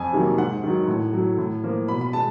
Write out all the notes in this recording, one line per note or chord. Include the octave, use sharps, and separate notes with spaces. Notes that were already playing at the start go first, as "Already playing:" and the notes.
Already playing: F2 G#5
C3 D#3 F#3 A#3
G#2 F#5
D#3 F#3
A2
F#3 A3
A2
F3 A#3
B2 B5
B5
G#3 B3 A5